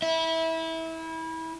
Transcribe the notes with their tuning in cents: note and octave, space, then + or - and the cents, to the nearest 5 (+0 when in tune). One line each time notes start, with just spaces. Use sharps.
E4 -25 E5 -20